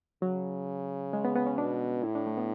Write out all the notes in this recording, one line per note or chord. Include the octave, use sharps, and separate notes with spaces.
C#3 F#3
G#3
B3
B3
C#4
B2 D4
A2 E4
D4
A3
B3